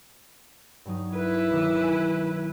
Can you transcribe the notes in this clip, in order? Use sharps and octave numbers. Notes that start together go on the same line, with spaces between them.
G2 F#3 D#4
E4 B4
B1 D#3 D6
G#5 D#7